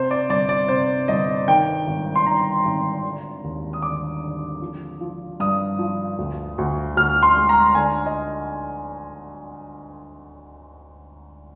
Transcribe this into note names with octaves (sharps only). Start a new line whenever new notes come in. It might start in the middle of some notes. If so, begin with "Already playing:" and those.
Already playing: C3 C5
D5
G1 D5
D5
C3 C5
G1 D#5
D#3 G5
G#1
C6
D#3 A#5
G#1
D3
D#2
D#6
D3 D6
D3
F3
F3
G2 D#6
F3
D2
D2
D2 F6
C6
G#3
A#5
D3 G#5
D#5